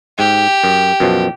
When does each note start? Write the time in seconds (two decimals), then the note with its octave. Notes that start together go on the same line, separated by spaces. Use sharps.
0.19 G#2 G4
0.64 F#2
1.00 F#2 B2 F3